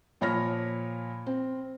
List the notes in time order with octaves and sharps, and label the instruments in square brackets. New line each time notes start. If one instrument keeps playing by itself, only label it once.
[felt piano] A#2 F3 C#5 B5 F6 A#6
C4